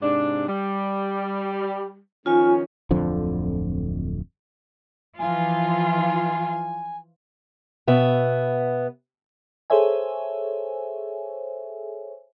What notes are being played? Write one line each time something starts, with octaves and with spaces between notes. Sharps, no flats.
G#2 C3 D4
G3
D#3 F3 C#4 F4 G#5
D1 F2 D3 F3
E3 F3 F4 G#5
B2 B3 E5
G#4 A4 C5 C#5 E5 G#5